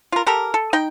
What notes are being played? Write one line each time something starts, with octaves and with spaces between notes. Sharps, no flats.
F4 A#4
G4 A4 A#4
A4
D#4 G5